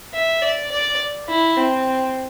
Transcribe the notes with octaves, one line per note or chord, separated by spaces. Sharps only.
E5
D5
D5
E4
C4